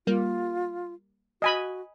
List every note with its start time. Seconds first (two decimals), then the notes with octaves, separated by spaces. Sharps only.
0.07 G3 A#3 F4
1.42 F#4 D#5 G#5 B5